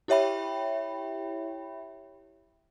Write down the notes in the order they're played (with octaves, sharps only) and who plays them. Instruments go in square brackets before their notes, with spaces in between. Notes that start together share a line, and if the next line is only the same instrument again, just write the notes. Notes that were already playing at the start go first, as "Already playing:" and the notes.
[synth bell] E4 G4 C#5 E5 G5 B5